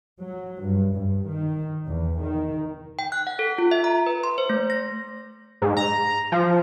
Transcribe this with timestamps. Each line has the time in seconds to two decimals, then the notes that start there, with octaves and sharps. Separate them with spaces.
0.21 F#3
0.62 G2
0.93 G2
1.27 D#3
1.86 E2
2.20 D#3
2.99 G5
3.12 F#6
3.27 F#5
3.39 A4
3.58 F4
3.71 E5
3.84 A#5
4.06 B4
4.24 C6
4.38 C5
4.50 A3
4.70 A#6
5.62 G#2
5.77 A#5
6.32 F3